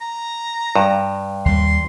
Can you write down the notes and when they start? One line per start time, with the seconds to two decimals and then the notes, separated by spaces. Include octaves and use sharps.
0.01 A#5
0.76 G2
1.45 D#2 G3 C6